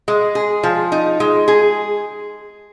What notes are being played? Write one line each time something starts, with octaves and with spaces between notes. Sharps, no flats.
G#3
G#4
F3
D#4
G#3
G#4